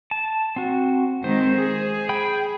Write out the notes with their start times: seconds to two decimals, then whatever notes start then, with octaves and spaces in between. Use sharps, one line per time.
0.11 A5
0.56 C4 F#4
1.24 D#3 G#3 C4 C5
1.57 G#4
2.09 G5 B5 G6